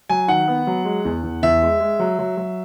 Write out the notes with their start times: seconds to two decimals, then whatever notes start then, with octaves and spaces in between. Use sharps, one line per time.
0.09 F#3 G#5
0.28 D#3 F#5
0.48 B3
0.67 F#3
0.85 G#3
1.05 E2
1.23 E2
1.43 E2 E5
1.62 G#3
1.80 G#3
1.99 F#3
2.19 F#3
2.37 F#3